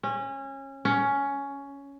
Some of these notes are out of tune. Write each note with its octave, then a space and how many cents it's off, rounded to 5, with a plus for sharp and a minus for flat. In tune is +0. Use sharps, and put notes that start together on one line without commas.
C#4 -25
C#4 +10